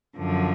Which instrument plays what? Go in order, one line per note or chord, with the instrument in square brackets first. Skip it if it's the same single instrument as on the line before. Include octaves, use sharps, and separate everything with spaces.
[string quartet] F#2 D3 F3